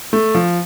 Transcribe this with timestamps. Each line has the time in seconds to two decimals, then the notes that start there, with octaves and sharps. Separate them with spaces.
0.13 A3
0.35 F3